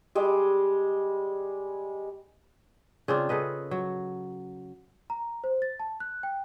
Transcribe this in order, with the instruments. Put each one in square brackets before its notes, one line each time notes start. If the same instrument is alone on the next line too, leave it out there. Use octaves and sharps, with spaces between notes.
[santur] G3 G#3
[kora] C#3 C4 D4 F4
C#3 A4 B4 D#5
F#3
[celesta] A#5
C5
A6
A5
F#6
G5